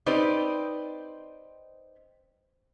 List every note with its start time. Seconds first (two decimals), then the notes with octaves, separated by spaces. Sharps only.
0.06 C4 D#4 G4 B4 C5 D5